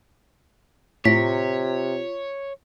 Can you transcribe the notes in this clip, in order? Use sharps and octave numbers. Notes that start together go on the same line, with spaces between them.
A2 C3 F4 C#5 B6